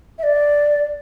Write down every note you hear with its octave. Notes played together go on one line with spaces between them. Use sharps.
E5
D5